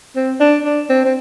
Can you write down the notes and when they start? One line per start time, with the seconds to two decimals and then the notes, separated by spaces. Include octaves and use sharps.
0.16 C4
0.40 D4
0.64 D4
0.89 C4
1.05 C4